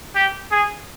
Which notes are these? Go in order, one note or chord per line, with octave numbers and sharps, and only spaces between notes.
G4
G#4